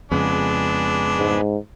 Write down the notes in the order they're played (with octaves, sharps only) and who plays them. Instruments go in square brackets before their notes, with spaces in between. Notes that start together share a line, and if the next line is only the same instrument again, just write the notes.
[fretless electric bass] F2 C#3 [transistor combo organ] G#3 B3 [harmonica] D4
[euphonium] G#2